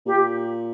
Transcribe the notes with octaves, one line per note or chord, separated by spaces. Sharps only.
A#2 G4